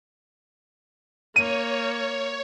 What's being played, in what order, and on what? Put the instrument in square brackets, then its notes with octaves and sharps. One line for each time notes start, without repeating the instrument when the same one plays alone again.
[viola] A#3 [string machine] C#5 [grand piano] D#7